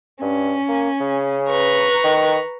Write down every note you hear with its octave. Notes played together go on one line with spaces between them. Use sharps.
G2 C#4
A#3
C#3
B4 A#5 C#6
D#3